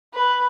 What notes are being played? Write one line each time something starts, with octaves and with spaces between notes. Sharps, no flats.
B4